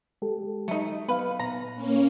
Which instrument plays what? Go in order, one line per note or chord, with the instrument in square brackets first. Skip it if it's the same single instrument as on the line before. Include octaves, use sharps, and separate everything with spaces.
[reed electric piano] G#3 G4 A4
[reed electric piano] F#3 [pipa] A3 D#4
[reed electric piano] B3 F5 [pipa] B4
[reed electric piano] A#2 [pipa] A#5
[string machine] A#3 C#4